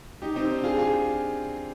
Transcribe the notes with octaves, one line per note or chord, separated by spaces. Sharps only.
D#4 G4
C4 D#4
D4
F4 G#4
F4 G#4